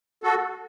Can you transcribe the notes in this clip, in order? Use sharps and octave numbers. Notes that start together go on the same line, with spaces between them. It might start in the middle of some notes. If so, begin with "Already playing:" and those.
F#4 A4